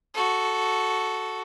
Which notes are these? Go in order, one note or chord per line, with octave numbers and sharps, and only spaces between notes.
F#4 A4